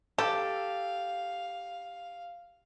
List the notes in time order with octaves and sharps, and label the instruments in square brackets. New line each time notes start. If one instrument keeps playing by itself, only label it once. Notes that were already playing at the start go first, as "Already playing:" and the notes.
[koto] G4 [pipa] A4 [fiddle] F5